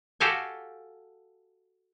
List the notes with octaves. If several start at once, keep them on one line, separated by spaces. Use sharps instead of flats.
F#4 G4 A4 F5 G5 G#5